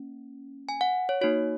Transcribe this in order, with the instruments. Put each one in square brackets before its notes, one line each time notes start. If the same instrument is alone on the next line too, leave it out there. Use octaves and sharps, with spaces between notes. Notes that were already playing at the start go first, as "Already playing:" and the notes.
Already playing: [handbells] A#3 C#4
G#5
F#5
C#5
A#3 D#4 F#4 C#5